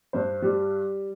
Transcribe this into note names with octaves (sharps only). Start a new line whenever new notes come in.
G2 C5
G3